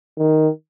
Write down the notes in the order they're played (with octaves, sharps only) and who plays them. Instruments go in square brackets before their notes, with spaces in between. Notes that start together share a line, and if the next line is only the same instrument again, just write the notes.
[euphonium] D#3